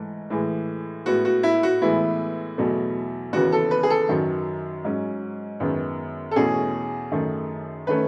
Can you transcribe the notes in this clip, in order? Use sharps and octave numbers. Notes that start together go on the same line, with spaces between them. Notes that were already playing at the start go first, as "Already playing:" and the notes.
Already playing: G#2 E3 A3
A2 E3 G#3
A2 G#3 B3 F#4
F#4
E4
F#4
A2 E3 G#3 B3 E4
E2 B2 F#3 A3
D#2 C#3 E3 B3 F#4
A4
B4
G#4
A4
F#2 D#3 F#3
G#2 F#3 C#4
F#2 D#3 G#3 B3
A4
E2 B2 A3 C#4 G#4
F#2 D#3 A3
D#3 A3 C#4 B4